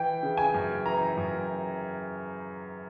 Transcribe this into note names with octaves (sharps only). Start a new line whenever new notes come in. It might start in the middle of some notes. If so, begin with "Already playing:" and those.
Already playing: E3 G5
C#3
G#5
F#2
E3 A#5
F#2